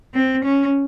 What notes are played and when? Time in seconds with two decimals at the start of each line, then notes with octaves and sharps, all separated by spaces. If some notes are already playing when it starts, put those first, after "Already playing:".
0.14 C4
0.45 C#4